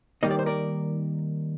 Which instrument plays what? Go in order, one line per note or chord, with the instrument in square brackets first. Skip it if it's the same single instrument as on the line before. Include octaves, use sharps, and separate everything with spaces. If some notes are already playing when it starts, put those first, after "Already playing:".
[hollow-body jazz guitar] D#3 G3 A#3 D#4 D#5
D5
C5
A#4 D5